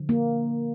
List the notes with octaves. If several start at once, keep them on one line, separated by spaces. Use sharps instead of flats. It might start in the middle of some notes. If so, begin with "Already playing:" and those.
Already playing: D3 F3
A#3